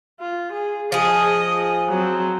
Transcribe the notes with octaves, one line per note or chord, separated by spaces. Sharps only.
F4
G#4
F3 G#4 D#5
F#3 C4